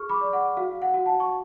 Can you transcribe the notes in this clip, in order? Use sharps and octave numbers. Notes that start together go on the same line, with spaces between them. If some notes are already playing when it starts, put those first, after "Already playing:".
Already playing: G#4 C#6 F6
B5 D6
D5
F#5
F#4 F5
F#5
F#4
F#5 A5
C#6